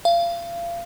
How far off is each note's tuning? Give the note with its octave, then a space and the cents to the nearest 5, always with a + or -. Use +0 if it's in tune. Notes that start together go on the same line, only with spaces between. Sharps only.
F5 -30